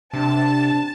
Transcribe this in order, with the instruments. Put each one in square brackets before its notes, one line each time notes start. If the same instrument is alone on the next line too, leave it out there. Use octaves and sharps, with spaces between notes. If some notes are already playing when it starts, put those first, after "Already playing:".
[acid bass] C3 [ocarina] D4 [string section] A5